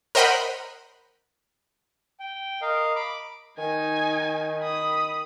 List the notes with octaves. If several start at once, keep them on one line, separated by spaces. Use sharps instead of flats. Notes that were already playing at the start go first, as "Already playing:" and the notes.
A#4 C5 D#5 F#5 B5
G5
A#4 D#5 F5
B5 D6
D#3 D#4 G#5
B5 D#6